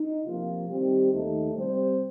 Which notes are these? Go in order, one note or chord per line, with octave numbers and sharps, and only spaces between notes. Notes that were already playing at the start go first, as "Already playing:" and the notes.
Already playing: D#4
C3 F3 A#3 F4
D#3 G3 C4 G4
D#2 D#3 A3 D#4
C3 G3 C4 G4 C5